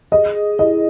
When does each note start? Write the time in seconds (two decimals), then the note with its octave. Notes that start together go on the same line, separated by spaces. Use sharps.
0.12 G#4 D#5
0.36 G#4
0.59 E4 D#5